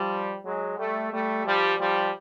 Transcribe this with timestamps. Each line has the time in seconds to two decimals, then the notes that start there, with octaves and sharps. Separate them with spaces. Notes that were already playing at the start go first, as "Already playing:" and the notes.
Already playing: F3 G3
0.44 F#3 G#3
0.78 G3 A3
1.12 G3 A3
1.45 F3 G3
1.78 F3 G3